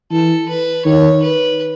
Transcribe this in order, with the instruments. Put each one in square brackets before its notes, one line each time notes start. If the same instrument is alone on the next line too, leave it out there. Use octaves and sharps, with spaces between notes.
[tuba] E3 [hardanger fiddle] A4
[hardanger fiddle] B4
[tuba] D#3 [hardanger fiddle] C#5
[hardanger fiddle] B4